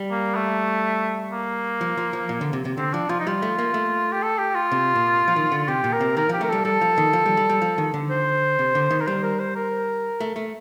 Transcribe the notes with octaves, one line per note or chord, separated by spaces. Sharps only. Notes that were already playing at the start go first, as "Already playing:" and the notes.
Already playing: G3
A#3
A3
A#3
F3
F3
F3
A#2
D3
C3
C3
D3 C4
F3 D4
F3 F4
D#4
G3 F4
A3
A#3
A3
G4
A4
G4
F4
C3
A#2
F3
D#3
D3
F4
C3 G4
A#2
A#4
C3
D#3 A#4
F3 G4
A3 A#4
G3 A4
G3 A4
F3
D#3
F3
G3
G3
G3
F3
D#3
D3
C5
C3
D3
D#3
A#4
G3 C5
A#4
C5
A#4
A3
A3